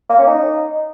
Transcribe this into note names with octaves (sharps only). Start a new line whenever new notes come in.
A#3
C#4
D#4